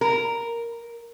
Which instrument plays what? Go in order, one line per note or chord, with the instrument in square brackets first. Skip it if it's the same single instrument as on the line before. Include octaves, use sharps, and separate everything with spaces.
[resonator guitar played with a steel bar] A#4